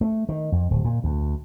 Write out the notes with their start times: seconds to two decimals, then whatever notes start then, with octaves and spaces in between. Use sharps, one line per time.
0.01 A3
0.29 D#3
0.52 F2
0.71 D1
0.85 A#2
1.04 D2